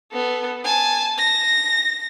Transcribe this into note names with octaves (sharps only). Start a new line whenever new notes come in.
B3 A4
G#5 A5
A#6